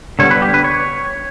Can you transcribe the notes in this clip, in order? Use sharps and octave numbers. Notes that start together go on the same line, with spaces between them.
D3 G3 B3 C#5
B4
G4
B4
C#5